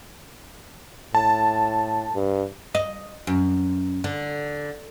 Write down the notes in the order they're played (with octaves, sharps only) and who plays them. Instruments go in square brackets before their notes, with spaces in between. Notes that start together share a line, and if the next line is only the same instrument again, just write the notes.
[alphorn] A2 [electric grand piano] A5
[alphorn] G2
[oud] D#5
F#2
D3